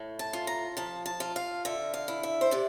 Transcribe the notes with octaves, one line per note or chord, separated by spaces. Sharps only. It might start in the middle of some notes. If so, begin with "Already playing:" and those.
Already playing: A2
A5
F4
A#5
F3 A5
A5
F4
F5
D3 E5
F5
E4
E5
C5
C3 D5